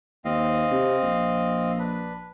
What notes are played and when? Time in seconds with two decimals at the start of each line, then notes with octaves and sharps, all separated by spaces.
0.25 D#2 C4 D#5 F5
0.72 C3
1.03 A#1
1.79 D4 B4